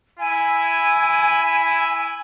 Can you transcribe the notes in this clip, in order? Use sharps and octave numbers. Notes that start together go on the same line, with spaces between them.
E4 G#5